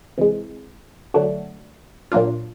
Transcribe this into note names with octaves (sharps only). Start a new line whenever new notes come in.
C3 E3 G#3
D3 F#3 A3 D4 F#4
A#2 F#3 A#3 D4 F4